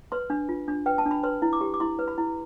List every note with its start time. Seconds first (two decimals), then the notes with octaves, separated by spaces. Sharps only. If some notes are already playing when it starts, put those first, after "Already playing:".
0.12 B4 C6
0.30 D4
0.49 F4
0.68 D4
0.86 B4 G5
0.98 A5
1.06 D4
1.11 B5
1.24 B4 C6
1.42 E4
1.53 D6
1.61 G4
1.74 D6
1.80 E4 C6
1.99 B4
2.08 B5
2.18 E4